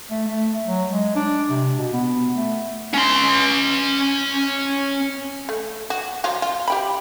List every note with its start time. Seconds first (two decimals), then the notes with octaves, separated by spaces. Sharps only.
0.11 A3
0.28 A3
0.66 F#3
0.90 G#3
1.16 D4
1.50 C3
1.78 B2
1.93 B3
2.34 A3
2.94 C#4 C6
5.49 A3
5.90 F#4
6.24 F3 F#3 F4
6.42 F4
6.68 G4 G5 B5